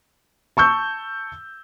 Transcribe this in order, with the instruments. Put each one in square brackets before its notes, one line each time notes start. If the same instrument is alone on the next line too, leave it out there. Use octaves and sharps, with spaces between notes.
[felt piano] A5 C#6 E6 G6